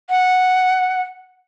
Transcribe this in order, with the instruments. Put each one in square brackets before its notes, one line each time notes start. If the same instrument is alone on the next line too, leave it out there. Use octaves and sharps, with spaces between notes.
[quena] F#5